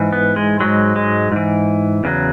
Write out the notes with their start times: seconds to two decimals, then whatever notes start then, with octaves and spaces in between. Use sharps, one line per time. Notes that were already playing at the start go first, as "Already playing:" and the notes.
Already playing: G#2 E3
0.13 B3
0.36 G#3
0.60 G#2 F#3 G#3
0.96 G#3
1.32 G#2 E3
2.04 E2 C#3 F#3